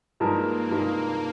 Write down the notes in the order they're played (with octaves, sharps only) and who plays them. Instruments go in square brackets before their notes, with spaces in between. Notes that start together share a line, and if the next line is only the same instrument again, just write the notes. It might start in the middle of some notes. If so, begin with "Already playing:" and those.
[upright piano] G2 F3 G#3 D#4 A#4 [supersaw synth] A#3
[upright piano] G2 F3 G#3 D#4 A#4 [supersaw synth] A#3